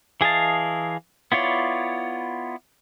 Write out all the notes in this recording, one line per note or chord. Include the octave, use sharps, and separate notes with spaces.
E3 G#4 D#5 F5 A5
B3 E4 F4 C#5 D5